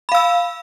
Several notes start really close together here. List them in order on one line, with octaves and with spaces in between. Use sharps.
B5 F5 E6